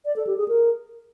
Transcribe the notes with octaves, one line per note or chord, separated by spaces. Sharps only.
D5
A4
G4
G#4
A#4